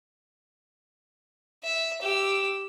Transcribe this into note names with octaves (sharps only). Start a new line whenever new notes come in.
E5
G4 E6